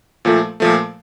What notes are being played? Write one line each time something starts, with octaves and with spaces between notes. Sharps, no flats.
A#2 F3 A3
A#2 F3 A3